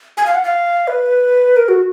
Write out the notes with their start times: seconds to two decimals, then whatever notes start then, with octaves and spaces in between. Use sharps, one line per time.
0.17 G#5
0.26 F5
0.35 F#5
0.44 F5
0.88 B4
1.56 A#4
1.68 F#4